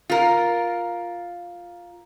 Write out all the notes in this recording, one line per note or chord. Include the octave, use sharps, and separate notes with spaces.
F4 A#4